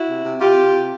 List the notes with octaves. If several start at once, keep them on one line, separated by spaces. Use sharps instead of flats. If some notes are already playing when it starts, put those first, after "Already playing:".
Already playing: E4 F#4
C3
C3
C3 F4 G4
C3
C3